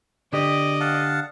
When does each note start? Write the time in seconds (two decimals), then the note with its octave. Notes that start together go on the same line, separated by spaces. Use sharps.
0.33 D3 G4 D5 D#5
0.81 F5 F#5 A5